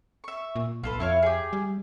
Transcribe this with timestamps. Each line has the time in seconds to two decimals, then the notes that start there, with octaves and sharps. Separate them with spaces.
0.24 E5 C#6
0.56 A#2
0.83 B1 F4 A4 B4
1.00 F2 E4 C#5 F5
1.23 G4 G#4
1.53 G3